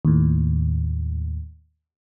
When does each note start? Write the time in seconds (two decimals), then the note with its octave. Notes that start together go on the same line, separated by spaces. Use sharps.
0.05 D#2 A2